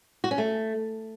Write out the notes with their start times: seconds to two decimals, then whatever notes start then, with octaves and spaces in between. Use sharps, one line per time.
0.24 F#4
0.31 C#4
0.38 A3